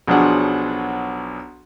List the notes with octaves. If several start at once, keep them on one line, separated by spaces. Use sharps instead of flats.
B1 F3 F#3 D4 G#4 F#5